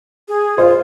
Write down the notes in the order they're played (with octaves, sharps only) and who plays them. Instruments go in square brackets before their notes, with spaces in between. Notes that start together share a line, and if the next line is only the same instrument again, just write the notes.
[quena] G#4
[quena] F4 [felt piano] C5